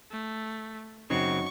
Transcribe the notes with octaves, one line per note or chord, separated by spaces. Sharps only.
A3
F#2 C#3 F#3 C4 D#4 C#6